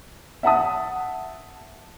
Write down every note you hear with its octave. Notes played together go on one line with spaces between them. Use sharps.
E5 F#5 A5 D#6